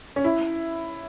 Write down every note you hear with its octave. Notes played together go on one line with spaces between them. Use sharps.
C#4
E4